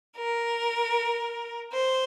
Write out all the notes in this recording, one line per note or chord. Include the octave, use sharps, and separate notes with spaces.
A#4
C5